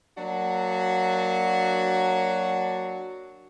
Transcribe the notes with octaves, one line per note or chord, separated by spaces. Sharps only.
F#3 A#3 D4 F#4